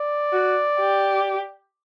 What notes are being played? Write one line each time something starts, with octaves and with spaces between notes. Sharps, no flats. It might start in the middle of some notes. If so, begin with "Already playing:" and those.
Already playing: D5
F#4
G4